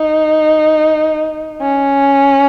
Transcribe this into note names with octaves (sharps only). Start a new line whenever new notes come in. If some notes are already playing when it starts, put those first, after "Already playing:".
Already playing: D#4
C#4